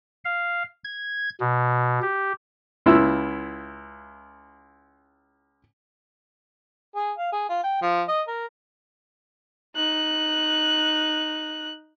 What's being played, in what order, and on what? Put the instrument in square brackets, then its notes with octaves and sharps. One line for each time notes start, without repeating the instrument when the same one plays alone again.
[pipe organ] F5
G#6
B2
G4
[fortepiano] C#2 E4 F4 E6
[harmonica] G#4
F5
G#4
F4
G5
F3
D#5
A#4
[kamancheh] D#4 F#6